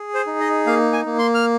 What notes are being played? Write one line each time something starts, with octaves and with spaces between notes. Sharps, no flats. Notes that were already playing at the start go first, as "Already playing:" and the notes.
Already playing: G#4
C5
D#4
D#5
A#3 F5
G#5
A#3
C6
F6